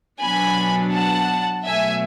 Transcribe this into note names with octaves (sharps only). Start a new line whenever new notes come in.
B2 F#3 B3 D4 G#5 B5
F#5 A5
B2 F#3 A3 E5 G#5